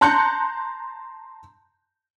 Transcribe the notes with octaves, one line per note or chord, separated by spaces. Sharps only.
A5 A#5 C6 F#6 G6 C#7